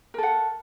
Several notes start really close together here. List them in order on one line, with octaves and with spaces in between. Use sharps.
A#4 A4 F#5